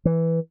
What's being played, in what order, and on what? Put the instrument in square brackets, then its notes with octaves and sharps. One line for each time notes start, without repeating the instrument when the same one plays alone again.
[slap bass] E3